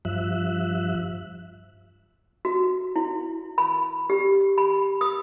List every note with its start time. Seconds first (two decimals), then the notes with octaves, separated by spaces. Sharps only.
0.05 G2 F3 E5 F#6
2.45 F#4
2.96 E4
3.58 B5
4.10 G4
4.58 B5
5.01 D#6